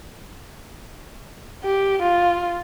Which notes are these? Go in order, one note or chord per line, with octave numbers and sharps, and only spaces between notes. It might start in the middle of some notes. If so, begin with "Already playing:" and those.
G4
F4